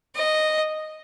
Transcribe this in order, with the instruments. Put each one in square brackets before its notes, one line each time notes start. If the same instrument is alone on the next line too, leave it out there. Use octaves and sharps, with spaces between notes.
[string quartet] D#5